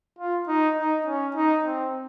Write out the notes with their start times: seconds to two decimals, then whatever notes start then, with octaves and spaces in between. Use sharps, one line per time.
0.19 F4
0.48 D#4
0.77 D#4
1.06 C#4
1.36 D#4
1.65 C4